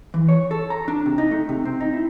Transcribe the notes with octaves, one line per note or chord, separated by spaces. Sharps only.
E3
C#5
A4
A#5
D4
C3
D#4
A3
C3
C4
D#4
E4